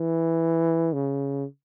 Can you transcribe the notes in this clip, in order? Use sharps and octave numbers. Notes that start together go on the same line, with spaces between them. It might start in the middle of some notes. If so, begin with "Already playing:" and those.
Already playing: E3
C#3